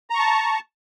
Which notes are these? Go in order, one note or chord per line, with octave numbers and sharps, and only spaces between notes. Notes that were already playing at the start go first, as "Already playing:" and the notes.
A5 A#5 C#6